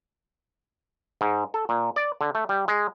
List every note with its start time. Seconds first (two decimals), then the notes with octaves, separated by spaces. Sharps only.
1.21 G#2
1.54 A4
1.69 A#2
1.96 D5
2.21 D3
2.35 A3
2.49 G3
2.68 G#3